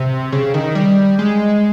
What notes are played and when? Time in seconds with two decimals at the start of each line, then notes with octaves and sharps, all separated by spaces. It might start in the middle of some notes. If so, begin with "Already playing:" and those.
Already playing: C3
0.32 C#3
0.54 D#3
0.75 G3
1.19 G#3